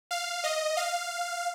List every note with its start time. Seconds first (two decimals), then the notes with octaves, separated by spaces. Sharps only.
0.11 F5
0.44 D#5
0.77 F5